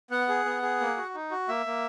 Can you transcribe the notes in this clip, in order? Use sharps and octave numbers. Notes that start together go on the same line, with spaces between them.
B3 F#5
G#4
B3
G#4
A#3
F#4
D#4
F#4
A#3 E5
A#3